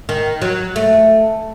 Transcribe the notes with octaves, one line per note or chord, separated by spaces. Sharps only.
D#3
F#3
A3